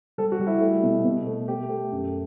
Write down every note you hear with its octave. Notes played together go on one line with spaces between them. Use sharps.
G3 A4
F#4
G3
E4
A3
B2
B2
A3
A3 G4
A3
F#2